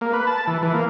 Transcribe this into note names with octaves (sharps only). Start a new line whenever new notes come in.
A#3
B4
A5
E3
E3
A#3